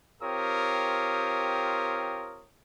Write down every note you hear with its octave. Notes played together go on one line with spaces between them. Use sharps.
C4 F4 G4 A#4 C#5 D#6